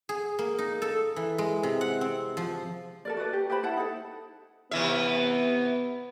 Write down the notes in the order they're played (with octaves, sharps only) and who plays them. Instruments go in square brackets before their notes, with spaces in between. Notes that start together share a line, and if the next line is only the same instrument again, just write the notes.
[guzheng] G#4
A#3
D#4
A4
E3
G#3
C3
F#5
C4
F3
[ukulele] A4 A#4 D5
F#4 A4 B4 D5
G4
G4 B4 C5 B5
E4 F#5 A5
D#4 A4
[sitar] C3 E3 E5 [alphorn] B3